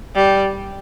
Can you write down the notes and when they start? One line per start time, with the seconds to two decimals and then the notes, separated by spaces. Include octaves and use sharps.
0.15 G3